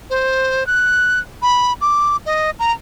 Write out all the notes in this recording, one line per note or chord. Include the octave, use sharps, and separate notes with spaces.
C5
F#6
B5
D6
D#5
A#5